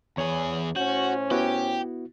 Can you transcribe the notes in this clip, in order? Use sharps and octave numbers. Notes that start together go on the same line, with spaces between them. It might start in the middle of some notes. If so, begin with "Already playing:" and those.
E2 G#4 C#5
A2 C#4 F#4 C5 G6
B3 E4 F#4 G4